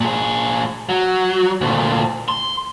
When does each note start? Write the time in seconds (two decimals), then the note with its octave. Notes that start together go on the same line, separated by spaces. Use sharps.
0.01 A#2 G#4
0.89 F#3
1.61 D2 A#2
2.28 C6